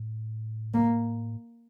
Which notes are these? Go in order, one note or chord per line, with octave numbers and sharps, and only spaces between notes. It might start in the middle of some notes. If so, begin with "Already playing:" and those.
Already playing: A2
A#3